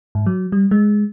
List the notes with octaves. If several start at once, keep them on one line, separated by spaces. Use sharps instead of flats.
G#2
F#3
G3
G#3